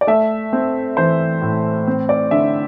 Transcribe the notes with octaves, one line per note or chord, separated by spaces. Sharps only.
D5
A3 E5
C4
E3 C5
A2
C4
D5
D3 E5